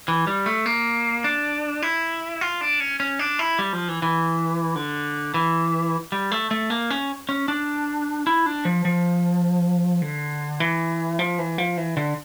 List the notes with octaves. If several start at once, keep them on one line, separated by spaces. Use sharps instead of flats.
E3
G3
A3
A#3
D4
E4
F4
D4
C#4
C#4
D4
E4
G3
F3
E3
E3
D3
E3
G3
A3
A3
A#3
C#4
C#4
D4
E4
D4
F3
F3
D3
E3
F3
E3
F3
E3
D3